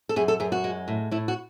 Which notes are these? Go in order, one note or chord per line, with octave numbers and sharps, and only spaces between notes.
A4
F#2 G#4
A4
F#2 G#4
F#4
G#3
A2
A2 E4
F#4